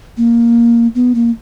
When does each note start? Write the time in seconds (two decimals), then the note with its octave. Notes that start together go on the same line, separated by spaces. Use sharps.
0.17 A#3
0.95 B3
1.15 A#3